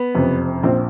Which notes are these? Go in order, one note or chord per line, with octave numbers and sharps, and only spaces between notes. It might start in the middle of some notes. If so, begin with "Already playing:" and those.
Already playing: B3
F#1 F2 C3
A#1 A#2 C4